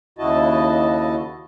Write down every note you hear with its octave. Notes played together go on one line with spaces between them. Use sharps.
D#2 C#3 E4 F#4 D#5 A5